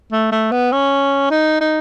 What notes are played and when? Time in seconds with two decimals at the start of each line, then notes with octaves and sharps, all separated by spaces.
0.12 A3
0.32 A3
0.52 B3
0.72 C#4
1.30 D#4
1.61 D#4